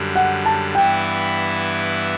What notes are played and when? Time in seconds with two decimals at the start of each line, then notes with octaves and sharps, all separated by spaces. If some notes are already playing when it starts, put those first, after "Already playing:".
Already playing: F#2 D3 G3
0.16 F#5
0.46 A5
0.75 G2 E3 B3 E4 G5